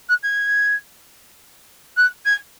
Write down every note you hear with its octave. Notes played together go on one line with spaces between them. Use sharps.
F#6
G#6
F#6
G#6